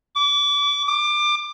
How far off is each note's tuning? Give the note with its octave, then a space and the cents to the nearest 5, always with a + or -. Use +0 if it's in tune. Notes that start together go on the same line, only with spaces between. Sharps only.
D6 -30
D6 +20